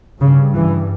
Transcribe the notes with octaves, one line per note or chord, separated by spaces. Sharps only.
G2 C#3
E3